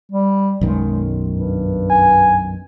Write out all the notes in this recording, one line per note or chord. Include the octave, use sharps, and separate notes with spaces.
G3
B1 F#2 D#3 G#3
G2
G#5